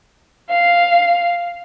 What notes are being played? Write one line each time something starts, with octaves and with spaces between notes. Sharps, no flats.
F5